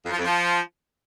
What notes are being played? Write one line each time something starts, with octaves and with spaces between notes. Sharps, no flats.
F2
F3
F2
F3